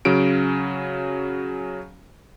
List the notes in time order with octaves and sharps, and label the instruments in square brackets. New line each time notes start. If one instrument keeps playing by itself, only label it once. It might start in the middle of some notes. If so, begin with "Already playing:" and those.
[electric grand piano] C#3 F#3 C#4 D7